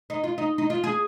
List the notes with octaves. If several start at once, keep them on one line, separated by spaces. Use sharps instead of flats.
D#4
F4
D#4
D#4
F4
G#4